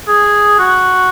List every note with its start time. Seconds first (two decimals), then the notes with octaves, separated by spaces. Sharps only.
0.08 G#4
0.59 F#4